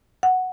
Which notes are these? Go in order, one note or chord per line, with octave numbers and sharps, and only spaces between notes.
F#5